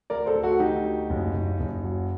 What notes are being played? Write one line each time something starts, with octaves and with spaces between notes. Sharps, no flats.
D2 A#4 D5
A4 C5
D2
F#4 A4
D2 D#4 G4
D2
F#1
F#1
F#1
F#3